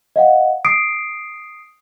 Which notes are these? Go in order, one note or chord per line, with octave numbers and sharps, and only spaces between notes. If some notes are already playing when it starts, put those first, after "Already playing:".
D#5 F5 F#5
D#6 C7 D7